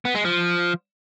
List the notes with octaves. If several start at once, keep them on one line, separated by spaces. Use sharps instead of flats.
B3
G#3
F3